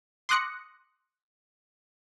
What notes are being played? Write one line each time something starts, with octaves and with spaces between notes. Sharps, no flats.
C6 D6 D#6 F#6 A#6 C#7